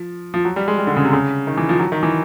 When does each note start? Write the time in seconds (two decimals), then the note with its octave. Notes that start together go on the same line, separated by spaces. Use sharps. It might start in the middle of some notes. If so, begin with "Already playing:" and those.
Already playing: F3
0.34 F3
0.45 F#3
0.56 G3
0.68 G#3
0.78 G3
0.87 D3
0.96 C#3
1.05 C3
1.13 C#3
1.47 D#3
1.58 E3
1.69 F3
1.80 F#3
1.92 D#3
2.03 E3